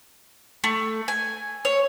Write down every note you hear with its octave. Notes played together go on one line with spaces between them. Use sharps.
A3
G#5
C#5